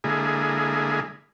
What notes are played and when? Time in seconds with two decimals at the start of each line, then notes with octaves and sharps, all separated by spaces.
0.04 D3 G#3 A#3 E4 G#4